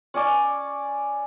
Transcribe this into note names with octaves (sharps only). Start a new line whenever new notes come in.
C#4 D5